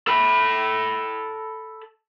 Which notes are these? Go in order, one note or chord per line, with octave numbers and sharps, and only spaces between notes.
A4 B5